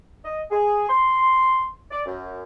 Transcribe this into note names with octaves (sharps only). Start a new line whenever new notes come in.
D#5
G#4
C6
D5
F#2